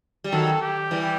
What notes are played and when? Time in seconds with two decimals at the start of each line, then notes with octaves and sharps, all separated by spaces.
0.24 G3
0.32 D#3 F#3 A4
0.61 G4
0.91 E3 G3